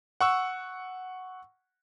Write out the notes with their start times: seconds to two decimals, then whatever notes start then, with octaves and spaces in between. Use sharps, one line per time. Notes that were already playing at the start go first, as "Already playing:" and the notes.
0.21 F#5 C#6 E6